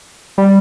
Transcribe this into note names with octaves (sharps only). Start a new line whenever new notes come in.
G3